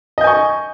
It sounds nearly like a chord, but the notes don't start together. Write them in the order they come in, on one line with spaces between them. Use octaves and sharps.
D#5 G6 G#5 C#6